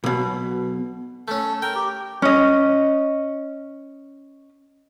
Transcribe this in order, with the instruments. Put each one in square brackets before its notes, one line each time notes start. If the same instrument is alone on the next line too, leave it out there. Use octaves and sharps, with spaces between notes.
[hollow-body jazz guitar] B1 B2
[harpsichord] A3 C#4 [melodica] A4
[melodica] A#4 [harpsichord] G5
[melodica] G4
[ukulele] C#4 D#5